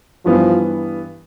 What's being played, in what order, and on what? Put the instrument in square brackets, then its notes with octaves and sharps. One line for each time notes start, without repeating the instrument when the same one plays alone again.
[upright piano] G2 E3 B3 [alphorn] F3